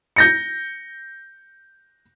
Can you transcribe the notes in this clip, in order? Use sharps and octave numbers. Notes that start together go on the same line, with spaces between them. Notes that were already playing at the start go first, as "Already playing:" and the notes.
G6 A#6 C#7